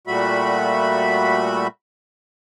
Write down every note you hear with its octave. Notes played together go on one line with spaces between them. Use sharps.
A#2 G3 A3 F#4 E5 B5